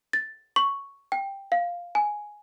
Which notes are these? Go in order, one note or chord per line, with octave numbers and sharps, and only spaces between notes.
A6
C#6
G5
F5
G#5